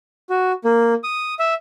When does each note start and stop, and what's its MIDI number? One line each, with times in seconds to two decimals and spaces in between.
0.30 0.52 66
0.64 0.94 58
1.04 1.34 87
1.39 1.54 76